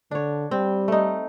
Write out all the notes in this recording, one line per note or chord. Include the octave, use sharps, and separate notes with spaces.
D3 D4 C#5
G3 C4
A3 D#4